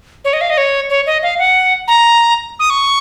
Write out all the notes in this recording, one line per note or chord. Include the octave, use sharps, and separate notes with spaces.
C#5
D#5
F5
D#5
C#5
C#5
D#5
F5
F#5
A#5
D#6
C#6